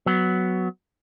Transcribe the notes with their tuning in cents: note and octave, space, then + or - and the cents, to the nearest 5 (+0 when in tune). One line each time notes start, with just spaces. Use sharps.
F#3 +0 B3 +5